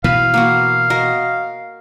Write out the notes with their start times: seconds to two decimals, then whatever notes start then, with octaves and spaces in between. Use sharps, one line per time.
0.04 B2 E3 B4 F5
0.34 A#3 B3 F#4
0.90 F#4 A#4 D#5